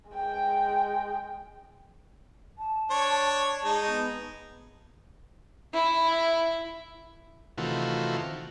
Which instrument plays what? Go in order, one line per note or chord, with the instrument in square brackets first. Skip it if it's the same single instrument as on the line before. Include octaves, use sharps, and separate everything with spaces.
[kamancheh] G#3 G5
[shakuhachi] A5
[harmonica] D4 C#5
[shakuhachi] A5
[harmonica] G#3 D#4
[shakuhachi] B3
[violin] E4
[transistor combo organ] C3 D#3 E3 A3 F4 F#4